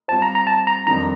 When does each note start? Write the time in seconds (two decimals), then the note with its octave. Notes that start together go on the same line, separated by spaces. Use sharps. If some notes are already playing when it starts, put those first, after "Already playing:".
0.08 G3 C4 F4 C5 A5
0.22 A#5
0.35 A#5
0.47 A5
0.67 A#5
0.86 F2 D#3 G3 D4 A#5